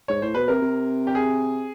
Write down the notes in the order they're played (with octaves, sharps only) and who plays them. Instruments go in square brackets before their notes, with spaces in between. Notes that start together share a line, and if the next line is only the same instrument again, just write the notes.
[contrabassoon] G#2 [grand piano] C#5
[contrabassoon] A2 [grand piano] C5
[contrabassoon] B2 [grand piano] B4
[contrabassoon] C3 [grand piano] A#4
[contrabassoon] C3
[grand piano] G4
G#4